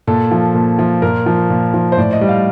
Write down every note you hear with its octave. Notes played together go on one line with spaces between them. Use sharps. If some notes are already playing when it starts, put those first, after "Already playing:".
A#2 A4
F3
A#2
F3
A#2 A#4
F3
A#2
F3
C5
A2 D5
D#5
G3
F5